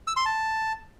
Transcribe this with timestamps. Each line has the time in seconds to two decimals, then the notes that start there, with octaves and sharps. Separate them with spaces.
0.07 E6
0.16 C6
0.25 A5